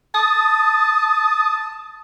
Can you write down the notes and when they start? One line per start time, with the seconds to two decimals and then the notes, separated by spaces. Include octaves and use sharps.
0.15 A5 D#6